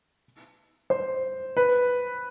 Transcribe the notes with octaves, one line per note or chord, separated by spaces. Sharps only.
C5
B4